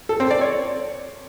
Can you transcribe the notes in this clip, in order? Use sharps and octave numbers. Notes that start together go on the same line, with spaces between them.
A4
C4
D5
C#5